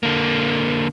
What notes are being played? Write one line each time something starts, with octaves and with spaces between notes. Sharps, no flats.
D3 A#3